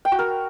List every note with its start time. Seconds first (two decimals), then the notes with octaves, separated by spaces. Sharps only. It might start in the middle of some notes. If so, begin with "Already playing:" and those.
0.05 G5
0.12 F#4
0.19 A#4